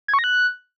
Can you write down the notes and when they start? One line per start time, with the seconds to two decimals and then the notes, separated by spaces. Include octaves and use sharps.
0.08 G#6
0.14 C#6
0.19 A#6
0.24 F#6